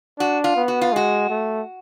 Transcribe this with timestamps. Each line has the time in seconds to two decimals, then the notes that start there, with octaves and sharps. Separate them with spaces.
0.19 D4 F#4
0.44 F4
0.56 B3
0.68 F#4
0.81 F4
0.93 G#3 F#4
1.30 A3